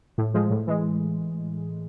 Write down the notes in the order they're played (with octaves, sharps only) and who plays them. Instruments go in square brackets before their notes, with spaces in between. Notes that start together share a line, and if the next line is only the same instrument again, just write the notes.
[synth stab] A2
F3 G#3
A2
E3 G#3